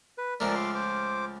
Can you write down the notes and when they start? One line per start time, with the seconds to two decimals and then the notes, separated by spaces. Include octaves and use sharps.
0.18 B4
0.40 C#2 F3 A3 A#4 D5
0.55 C6 D6
0.75 C5 D6